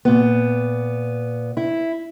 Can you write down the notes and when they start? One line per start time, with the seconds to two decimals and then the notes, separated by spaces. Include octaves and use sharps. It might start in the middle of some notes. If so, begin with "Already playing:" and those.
0.05 A#2 B3
1.57 E4